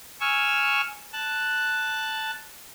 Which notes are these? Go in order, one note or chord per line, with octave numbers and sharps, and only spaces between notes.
G#5 C#6 E6 F6
A5 F#6